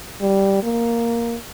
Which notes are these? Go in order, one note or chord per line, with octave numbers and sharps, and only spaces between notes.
G3
A#3